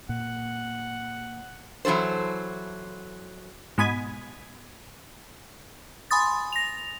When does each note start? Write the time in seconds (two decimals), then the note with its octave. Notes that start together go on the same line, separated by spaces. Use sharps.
0.09 A#2 F#5
1.85 E3 F#3 F#4 A4 C5
3.78 G#2 B2 G#5 B5 D#6 G#6
6.11 G#5 B5 C6 D#6 A6
6.52 A#6 F7